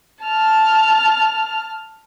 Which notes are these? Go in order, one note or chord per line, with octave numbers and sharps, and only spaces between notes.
A5 F6